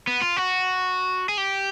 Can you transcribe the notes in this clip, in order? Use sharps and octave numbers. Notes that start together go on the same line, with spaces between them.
B3
F4
F#4
G#4
G4